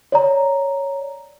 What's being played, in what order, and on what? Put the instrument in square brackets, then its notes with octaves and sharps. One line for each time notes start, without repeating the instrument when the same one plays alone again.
[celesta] C#5 D5 A#5